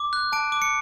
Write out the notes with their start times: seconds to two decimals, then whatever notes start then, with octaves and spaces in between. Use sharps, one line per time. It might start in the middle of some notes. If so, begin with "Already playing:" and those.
Already playing: D6
0.13 F#6
0.32 A5 D7
0.52 D6
0.62 C#7